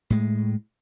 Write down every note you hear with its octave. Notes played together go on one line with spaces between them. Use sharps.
A2 G#3